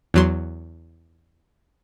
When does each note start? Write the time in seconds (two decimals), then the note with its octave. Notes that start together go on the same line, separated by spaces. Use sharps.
0.14 E2 F#3 C6